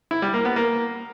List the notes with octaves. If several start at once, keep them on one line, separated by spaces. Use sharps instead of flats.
E4
G3
A#3
B3
A#3